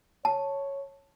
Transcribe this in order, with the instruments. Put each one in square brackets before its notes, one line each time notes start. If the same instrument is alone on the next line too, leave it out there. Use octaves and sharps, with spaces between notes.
[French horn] C#5 [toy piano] A5